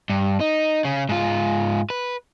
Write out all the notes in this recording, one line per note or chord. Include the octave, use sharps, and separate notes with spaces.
G2
D#4
C#3
G#2 F4
B4